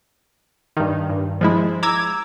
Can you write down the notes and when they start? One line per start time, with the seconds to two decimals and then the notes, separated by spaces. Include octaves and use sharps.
0.77 G2 D#3
1.10 G2
1.41 F3 G#3 E4
1.83 A#5 D6 E6 G#6